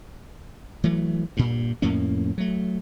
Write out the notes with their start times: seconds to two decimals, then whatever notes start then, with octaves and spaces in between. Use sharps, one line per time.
0.84 E3 F#3 A3
1.37 G2 A#2
1.82 F2 A2 A#3 C#4
2.38 F#3 A3